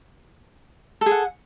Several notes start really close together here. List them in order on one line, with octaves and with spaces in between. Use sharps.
A4 G#4 F#5